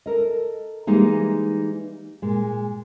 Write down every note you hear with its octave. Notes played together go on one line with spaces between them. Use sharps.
A4 A#4 D#5
E3 G3 G#3 A#3 D#4
A#2 G#3